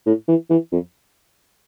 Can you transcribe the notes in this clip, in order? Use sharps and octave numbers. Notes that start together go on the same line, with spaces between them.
A2
E3
E3
F2